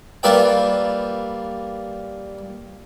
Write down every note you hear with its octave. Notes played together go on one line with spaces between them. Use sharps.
G3 A#3 F4 B4 E5 G5